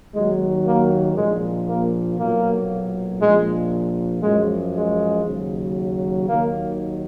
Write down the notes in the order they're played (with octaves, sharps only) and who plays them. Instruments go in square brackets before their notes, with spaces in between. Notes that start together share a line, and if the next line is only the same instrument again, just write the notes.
[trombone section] D#2 D#3 F#3 G#3
A#3
A#1 A#2 F3 G#3
A#3
B1 A#2 F#3 A#3
A#1 A#2 F3 G#3
F#2 F3 G#3
G#3
D#2 C#3 F#3
D#2 D#3 F#3 A#3